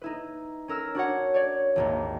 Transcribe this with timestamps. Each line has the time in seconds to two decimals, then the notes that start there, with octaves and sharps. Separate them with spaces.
0.02 D#4 E4 B4
0.68 C#4 A#4 E6 F6
0.95 D4 F#4 C#5 F#5
1.34 C#5 D5
1.76 G#1 D#2 A#2